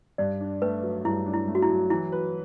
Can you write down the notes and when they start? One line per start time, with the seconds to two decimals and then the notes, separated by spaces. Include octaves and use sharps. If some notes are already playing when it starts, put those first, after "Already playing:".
0.18 G2 D5
0.41 D4
0.62 A3 B4
0.83 F#3
1.05 G2 E4
1.26 D4
1.34 E4
1.47 A3
1.55 F#4
1.62 E4
1.69 F#3
1.90 E3 E4
2.12 B4